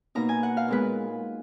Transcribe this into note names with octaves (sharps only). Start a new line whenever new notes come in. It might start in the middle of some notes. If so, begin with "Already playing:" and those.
B2 A#3 D#4 A#5
G#5
F#5
F5
A#2 G#3 B3 B4